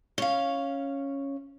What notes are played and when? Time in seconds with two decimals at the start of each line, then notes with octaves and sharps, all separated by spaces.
0.18 C#4 F5